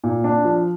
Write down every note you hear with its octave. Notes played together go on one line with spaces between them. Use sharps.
A#2
D4
F3